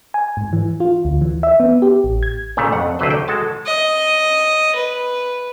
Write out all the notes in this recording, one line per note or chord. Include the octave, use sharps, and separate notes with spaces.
G#5
G#2
E3
F4
D2
E3
E5
B3
G4
A1
G#6
A#2 C#3 A3
F2 F#5
D2 D3 F#3 B4 C5
G5
G#3 F#4 A4 A5
D#5
B4